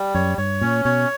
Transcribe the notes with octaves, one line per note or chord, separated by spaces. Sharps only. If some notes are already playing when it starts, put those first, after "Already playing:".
Already playing: G3
F#2 C#5
G2 C#5
A#2 C#4
B2 C#5